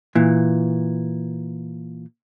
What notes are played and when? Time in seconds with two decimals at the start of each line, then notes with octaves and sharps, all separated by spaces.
0.15 A#2 E3